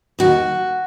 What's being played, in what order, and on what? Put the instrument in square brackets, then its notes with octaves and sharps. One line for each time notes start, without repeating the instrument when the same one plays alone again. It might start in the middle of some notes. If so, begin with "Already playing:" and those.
[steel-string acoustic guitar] D#2 F#4